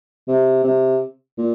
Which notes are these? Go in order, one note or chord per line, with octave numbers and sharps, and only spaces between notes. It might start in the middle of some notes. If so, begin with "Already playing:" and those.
C3
C3
A#2